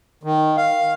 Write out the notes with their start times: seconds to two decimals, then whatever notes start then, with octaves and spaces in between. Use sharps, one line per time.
0.23 D#3
0.57 F5